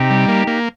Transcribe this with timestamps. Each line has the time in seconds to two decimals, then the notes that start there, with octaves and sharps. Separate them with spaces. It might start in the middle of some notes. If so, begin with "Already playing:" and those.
Already playing: C3 D#4 G4
0.10 G3
0.28 A#3
0.47 A#3